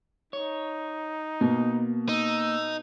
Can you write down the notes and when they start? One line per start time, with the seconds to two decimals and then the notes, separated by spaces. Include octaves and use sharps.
0.33 D#4 C#5
1.41 B2 A#3
2.09 D#4 E6